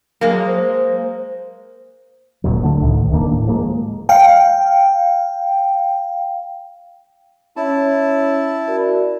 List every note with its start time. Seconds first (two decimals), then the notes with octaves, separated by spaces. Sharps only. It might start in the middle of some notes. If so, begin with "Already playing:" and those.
0.21 F#3 G#3 A#3
0.46 C5
2.44 D1 D#2 A#2 F#3
2.63 D3 A3
2.82 C#2 A2 D#3
3.11 D#1 D#3 A#3 D4
3.30 A2
3.47 F3 G#3 A#3
4.09 F5 G5
7.56 C#4 E4 C#5 A5
8.68 F#4 A#4 D5